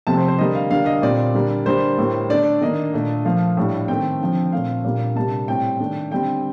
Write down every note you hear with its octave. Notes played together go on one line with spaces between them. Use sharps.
C3 F3 A3 C4 A5
C5
C5
D3 G3 A#3 D#5
F5
D3 G3 A#3 D4 F5
D#5
A#2 G3 C4 D5
D3 G3 A#3 D4
D3 G3 A#3 D4 C5
A2 G3 A#3
D3 A3 D4 D5
D#3 A#3 D4 D#5
A#2 A3 D4
A#2 F3 A3 F5
A2 G3 D4
D#3 A3 C4 G5
D3 F3 C4
A#2 A3 C4 F5
A#2 G3 A#3 D4
C3 G3 A#3 D4 A5
A2 G3 C4 G5
D#3 A3 D4
D3 G3 C4 G5